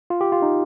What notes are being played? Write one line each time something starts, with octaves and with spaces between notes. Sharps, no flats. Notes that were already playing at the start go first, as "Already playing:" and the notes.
F4
G4
F4
D#4